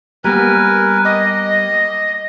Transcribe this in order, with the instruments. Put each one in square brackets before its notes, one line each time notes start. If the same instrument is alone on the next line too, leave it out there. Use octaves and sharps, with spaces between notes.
[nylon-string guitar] G3 A#3 B3 [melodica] A#4 B4 G#5
[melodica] G4 [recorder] D#5